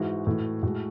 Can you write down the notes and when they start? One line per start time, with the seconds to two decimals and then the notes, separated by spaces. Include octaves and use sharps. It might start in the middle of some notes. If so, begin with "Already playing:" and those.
Already playing: G#2 E3 G#3 F#4
0.26 A2 E3 A3
0.63 A2 G#3 F#4